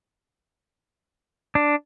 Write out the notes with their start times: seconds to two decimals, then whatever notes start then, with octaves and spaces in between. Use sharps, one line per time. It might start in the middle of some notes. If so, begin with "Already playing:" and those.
1.55 D4